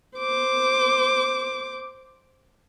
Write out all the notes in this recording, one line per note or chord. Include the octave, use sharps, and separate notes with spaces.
C5 D6